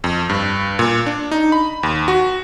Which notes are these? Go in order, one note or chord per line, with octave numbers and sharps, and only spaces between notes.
F2
G2
A#2
D4
D#4
B5
D#2
F#4